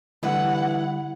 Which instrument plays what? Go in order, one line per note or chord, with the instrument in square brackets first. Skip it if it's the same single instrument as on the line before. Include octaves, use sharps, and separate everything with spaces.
[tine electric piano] D3 G3 [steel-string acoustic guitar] E3 E4 B4 [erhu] F#5